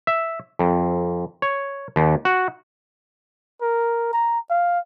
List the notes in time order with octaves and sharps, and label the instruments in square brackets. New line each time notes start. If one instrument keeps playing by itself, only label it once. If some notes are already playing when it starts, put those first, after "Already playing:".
[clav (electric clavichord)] E5
F2
C#5
D#2
F#4
[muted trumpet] A#4
A#5
F5